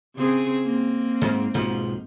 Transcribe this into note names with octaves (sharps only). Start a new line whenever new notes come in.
C#3 C4 G#4
A#3 C4
G#2
B1 G#2 F3